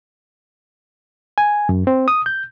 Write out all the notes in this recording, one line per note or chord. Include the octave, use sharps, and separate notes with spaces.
G#5
F#2
C4
D#6
G6